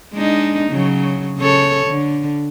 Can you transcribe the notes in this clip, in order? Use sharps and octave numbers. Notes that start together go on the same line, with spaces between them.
G#3 D4 D#4
C#3 F#3
C#3 A4 C#5
D3